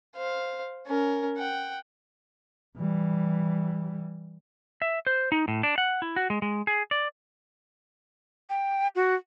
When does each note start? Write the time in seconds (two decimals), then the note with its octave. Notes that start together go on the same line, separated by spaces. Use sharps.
0.16 C5 F5
0.86 C#4 A#4
1.37 F#5 G5
2.78 E3 G3
4.82 E5
5.07 C5
5.32 D#4
5.48 A2
5.63 D4
5.78 F#5
6.02 E4
6.16 F#4
6.30 G#3
6.42 G#3
6.67 G#4
6.91 D5
8.50 G5
8.95 F#4